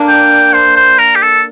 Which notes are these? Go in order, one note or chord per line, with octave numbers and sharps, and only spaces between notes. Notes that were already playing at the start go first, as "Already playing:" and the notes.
Already playing: A#3 D4
G5
C5
C5
A#4
G4
A4